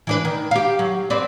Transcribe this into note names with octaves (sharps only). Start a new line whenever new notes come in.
E3 D4 B4
D#3
G4 F5
F#3
C4 B4 D5